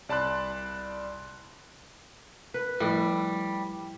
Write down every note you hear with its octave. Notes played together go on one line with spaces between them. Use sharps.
C2 D5 A5 B5 C6 F#6
B4
A2 F3 G3 E4